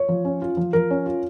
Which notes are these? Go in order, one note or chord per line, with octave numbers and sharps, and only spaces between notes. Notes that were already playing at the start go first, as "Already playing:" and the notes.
Already playing: C#5
F3
C#4
F4
F3
F3 A#4
C#4
F4